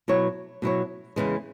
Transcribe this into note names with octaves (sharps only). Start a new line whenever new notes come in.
B2 F#3 E4 C#5
B2 F#3 E4 C#5
E2 C#3 E3 G#3